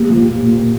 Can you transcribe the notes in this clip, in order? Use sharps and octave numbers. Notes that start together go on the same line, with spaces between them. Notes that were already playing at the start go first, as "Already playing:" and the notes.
Already playing: A#3 G4
F3
A#2
A#2